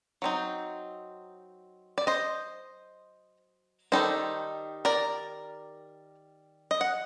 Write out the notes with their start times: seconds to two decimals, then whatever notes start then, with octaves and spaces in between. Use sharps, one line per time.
0.22 F#3 C4 D#4
1.98 D5
2.07 C5 D#5
3.92 D#3 G3 C4 D#4 A4 C5
4.85 A#4 D5
6.71 D#5
6.81 F#5